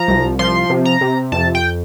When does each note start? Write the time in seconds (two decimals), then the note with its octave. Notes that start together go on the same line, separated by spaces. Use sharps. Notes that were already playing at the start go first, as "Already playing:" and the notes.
Already playing: F3 A#5
0.08 C2
0.39 F3 C6
0.70 C3
0.85 A#5
1.01 C3
1.32 F2 A5
1.55 G5